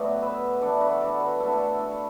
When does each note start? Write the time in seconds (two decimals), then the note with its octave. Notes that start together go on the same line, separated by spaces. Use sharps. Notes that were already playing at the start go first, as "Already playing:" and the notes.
Already playing: A2 F#3 B3 F#4 D5
0.22 B4 E5
0.61 E3 D4 A4 D5
0.81 F#4 B4
1.01 A4 D5
1.20 F#4 B4
1.40 D3 A3 D4 E4 A4
1.53 E4 A4
1.79 A4 D5